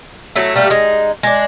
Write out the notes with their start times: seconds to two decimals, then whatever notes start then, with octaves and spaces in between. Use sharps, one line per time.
0.36 F#3 A3 E4
0.56 G3 A3 A#3 G4
0.70 G#3 D#4
1.23 G#3 D4